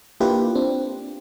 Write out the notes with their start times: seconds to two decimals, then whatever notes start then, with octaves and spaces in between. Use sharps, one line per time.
0.20 A#3 D4 E4 F4 G4 B4
0.55 C4 D4